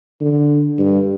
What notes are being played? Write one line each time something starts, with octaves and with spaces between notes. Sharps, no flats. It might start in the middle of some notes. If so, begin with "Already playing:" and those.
D3
G2